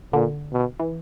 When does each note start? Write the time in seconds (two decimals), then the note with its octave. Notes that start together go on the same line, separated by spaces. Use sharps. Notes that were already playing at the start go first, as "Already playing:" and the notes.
0.13 A#2 D3
0.53 B2
0.80 E3